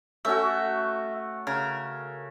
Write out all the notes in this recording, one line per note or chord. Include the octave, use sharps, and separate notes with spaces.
A3 C#4 F#4 E5
C#3 A#4